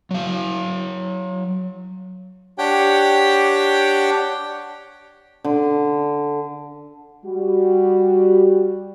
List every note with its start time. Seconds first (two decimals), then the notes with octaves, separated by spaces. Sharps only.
0.11 F#3 F5
2.58 D4 G4 C#5 F#5 G5
5.44 D3
7.24 G3 F#4